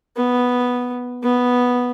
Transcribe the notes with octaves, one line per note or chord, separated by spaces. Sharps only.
B3
B3